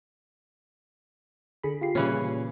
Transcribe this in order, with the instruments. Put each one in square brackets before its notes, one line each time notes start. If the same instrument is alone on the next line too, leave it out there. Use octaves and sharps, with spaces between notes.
[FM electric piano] D3 G#4 B5
F4 G4 C7
[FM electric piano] A#2 G3 [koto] C#3 E3 C#4